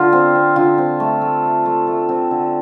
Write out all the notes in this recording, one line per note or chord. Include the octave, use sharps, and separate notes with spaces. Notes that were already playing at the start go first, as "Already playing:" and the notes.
Already playing: D3 F4
C4
C4
D3 F4
C4
A3
A3
A3
A3
A3
C4
D3